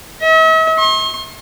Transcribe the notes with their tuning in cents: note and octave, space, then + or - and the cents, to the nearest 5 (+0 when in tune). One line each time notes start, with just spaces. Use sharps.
E5 -45
C6 +45